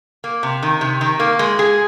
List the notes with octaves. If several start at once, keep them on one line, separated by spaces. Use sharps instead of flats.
A#3
C3
D#3
C3
D#3
A#3
G#3
G#4